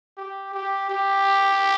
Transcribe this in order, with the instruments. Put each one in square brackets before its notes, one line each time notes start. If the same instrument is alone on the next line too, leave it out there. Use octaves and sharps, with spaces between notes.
[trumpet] G4
G4
G4